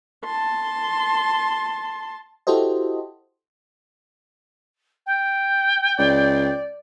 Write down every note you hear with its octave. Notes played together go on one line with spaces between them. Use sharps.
A5 C6
E4 F#4 G4 A4 C5 D#5
G5
C#2 D5